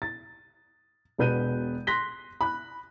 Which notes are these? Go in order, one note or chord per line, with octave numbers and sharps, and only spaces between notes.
A6
E1 B2 B4 G6 D#7
C6 F#6 A#6 B6 G7
B5 F#6